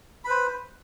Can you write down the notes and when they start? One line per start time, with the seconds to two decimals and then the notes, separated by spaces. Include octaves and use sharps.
0.25 B5
0.27 B4
0.30 C5